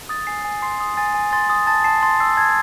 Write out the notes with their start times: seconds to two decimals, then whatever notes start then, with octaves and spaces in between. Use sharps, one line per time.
0.09 D#6 A6
0.27 G#5 C7
0.45 G#5
0.62 C6 C7
0.81 D#6
0.97 G#5 A6
1.14 G#5
1.33 C6 A6
1.50 D#6
1.67 A5 A6
1.84 A5 C7
2.03 C6 A6
2.20 E6 C7
2.37 A5 G#6